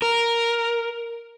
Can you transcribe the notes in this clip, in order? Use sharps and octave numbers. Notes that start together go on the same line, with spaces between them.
A#4